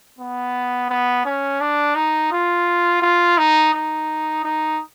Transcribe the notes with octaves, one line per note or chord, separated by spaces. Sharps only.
B3
B3
C#4
D4
D#4
F4
F4
D#4
D#4
D#4